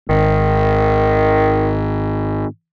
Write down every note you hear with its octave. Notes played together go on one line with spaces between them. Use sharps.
G#1 D#3